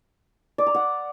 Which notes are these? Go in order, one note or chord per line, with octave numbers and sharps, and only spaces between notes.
D5
A#5
F#5